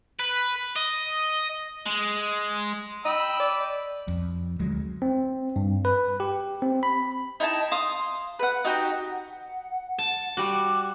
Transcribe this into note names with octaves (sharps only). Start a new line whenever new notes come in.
B4
D#5
G#3
D#5 G5 B5 E6
D5
F2
D2 F#3 G#3
C4
G2
B4
G4
C4
B5
D#4 E4 G5 A5
F5 C6 D#6
B4 F#5
D#4 F#4 G4 D#5
F#5
A5
G3 F#4 D6